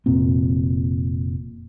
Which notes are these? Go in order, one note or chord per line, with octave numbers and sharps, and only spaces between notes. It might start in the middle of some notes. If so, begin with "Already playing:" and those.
F1 A#2 C4